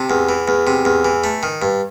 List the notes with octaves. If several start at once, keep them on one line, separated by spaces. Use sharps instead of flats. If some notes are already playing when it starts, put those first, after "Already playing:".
Already playing: C3 A4
E2
E3
E2
C3
E2
E3
A3
D#3
G2